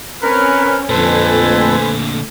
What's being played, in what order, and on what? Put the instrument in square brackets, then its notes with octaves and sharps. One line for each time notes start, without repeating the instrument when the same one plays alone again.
[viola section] C4 C#4 [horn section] A#4 B4
[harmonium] F2 A4 [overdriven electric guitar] A#2 D3 [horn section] B4 C5 G#5
[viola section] A3